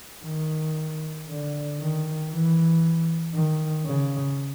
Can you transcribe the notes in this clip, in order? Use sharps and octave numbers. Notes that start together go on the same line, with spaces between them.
D#3
D3
D#3
E3
D#3
C#3